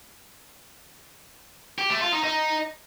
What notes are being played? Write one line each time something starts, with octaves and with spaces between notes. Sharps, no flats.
G4
A3
F4
D#4
D#4